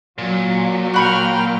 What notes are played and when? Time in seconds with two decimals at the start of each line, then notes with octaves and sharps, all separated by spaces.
0.18 A#2 F#3
0.94 F#4 G5 A#5 B5 C#6 F6